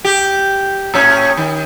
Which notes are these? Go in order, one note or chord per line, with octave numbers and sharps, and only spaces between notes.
G4
A2 C#4
D#3